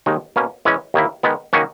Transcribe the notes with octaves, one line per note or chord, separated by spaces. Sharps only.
D#2 D#3 G#3 D#4
B2 A#3 C#4
E3 G#3 C#4
D#2 D#3 A#3 E4
D#3 G#3 B3
D#3 A#3 C#4 F#4